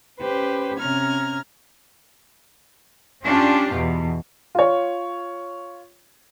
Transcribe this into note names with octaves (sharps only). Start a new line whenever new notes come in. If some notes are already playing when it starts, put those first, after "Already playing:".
C#4 G4 B4 C5
C3 C#4 A#5 F6 G#6
C#4 D4 F4 G4
E2 B2
F4 C#5